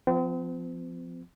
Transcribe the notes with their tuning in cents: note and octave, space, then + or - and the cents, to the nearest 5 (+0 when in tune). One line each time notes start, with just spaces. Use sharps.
F3 +0 C4 -40